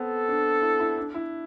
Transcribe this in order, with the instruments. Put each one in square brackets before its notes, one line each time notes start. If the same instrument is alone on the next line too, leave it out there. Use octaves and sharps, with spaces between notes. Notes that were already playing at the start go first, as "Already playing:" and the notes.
Already playing: [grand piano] B3 C4 [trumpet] A4
[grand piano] D4
E4
E4
D4
E4